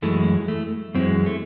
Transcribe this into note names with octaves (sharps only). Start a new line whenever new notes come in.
F#2 E3 G#3 A3
A3
F#2 E3 G#3 C4
A3